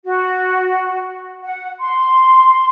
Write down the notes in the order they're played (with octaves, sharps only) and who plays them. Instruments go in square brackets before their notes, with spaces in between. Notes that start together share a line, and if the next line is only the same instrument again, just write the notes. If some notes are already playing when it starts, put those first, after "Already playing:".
[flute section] F#4
F#5
C6